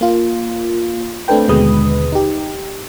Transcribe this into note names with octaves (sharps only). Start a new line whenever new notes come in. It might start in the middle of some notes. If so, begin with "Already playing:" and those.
A#3 F4
A3 C4 D4 A4 B4 G5
D#2 B2 D3 G#3 B4 D#6
D#4 G4